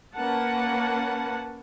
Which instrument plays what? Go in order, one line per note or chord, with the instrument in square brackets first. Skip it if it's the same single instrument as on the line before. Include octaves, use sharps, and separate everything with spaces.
[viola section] A#3 C#4 B4 F#5 A5